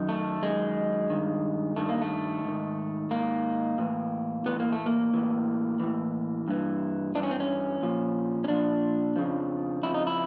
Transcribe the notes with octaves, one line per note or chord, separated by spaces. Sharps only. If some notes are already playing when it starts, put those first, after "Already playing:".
Already playing: F#2 D#3
A3
F#2 D#3 G#3
G2 D#3
G2 D#3 A3
A#3
A3
G#2 D#3
G#2 D#3 A#3
A2 E3
A2 E3 B3
A#3
A3
A#3
A2 E3
A2 E3
G2 E3
G2 E3 D4
C#4
C4
C#4
A#2 F3
C#4
A#2 F3 D4
F2 C#3 F3
F2 C#3 F3 E4
D#4
E4